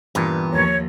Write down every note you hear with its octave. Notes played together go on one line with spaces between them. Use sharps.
G2 A#2 E3 B3
D#2 F3 C#5